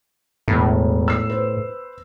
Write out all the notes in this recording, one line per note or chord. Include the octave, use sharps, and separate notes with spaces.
E1 A2
E6 C7
B4 C5